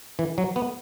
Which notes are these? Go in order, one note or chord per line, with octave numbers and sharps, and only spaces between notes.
E3
F#3
B3